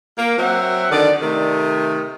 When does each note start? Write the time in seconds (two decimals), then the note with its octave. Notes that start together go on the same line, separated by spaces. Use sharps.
0.18 A#3
0.38 F#3 C4 E5 F#5
0.91 D3 D#3 D5
1.22 C3 D#3 A3